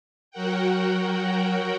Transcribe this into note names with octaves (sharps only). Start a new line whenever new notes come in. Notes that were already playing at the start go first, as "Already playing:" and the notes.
F#3 F#4 A#4 F#5 G5